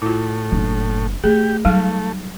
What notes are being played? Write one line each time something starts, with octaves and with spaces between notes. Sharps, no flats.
A2 E4 F4
F#1 D4
A3 G4 G#4
F#3 G3 A3 D#4 F5